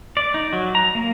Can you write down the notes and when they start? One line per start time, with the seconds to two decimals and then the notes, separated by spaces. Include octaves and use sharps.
0.17 D5
0.34 D#4
0.53 F#3
0.75 A#5
0.95 A#3